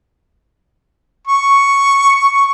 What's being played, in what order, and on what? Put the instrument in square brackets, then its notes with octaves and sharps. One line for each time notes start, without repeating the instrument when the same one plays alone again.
[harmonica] C#6